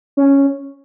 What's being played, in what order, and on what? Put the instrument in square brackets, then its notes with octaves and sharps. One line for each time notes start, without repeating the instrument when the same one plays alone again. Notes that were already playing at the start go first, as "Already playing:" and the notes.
[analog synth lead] C#4